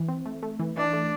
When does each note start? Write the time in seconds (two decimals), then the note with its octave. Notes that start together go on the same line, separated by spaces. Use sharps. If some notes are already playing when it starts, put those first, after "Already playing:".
Already playing: E3
0.09 C4
0.26 A3
0.43 A3
0.59 E3
0.77 E3 D4
0.93 A3